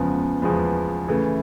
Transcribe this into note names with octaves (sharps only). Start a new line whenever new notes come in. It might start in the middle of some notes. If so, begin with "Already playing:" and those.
Already playing: E2 C#3 F3 G#3 B3
E2 C#3 F3 G#3 B3
C#3 E3 A3